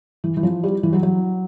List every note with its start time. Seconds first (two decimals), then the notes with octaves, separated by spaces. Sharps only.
0.24 E3
0.37 E3
0.43 F3
0.63 G3
0.83 E3
0.93 F#3
1.03 F#3